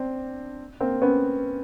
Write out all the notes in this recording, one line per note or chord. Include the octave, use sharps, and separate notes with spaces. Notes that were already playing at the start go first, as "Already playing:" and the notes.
Already playing: C4 D4
A#3 C4
B3 C#4